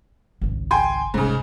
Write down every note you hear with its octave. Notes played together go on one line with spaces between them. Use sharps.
G#1 C#2
G5 G#5 C6
F#1 C2 G#2 C#3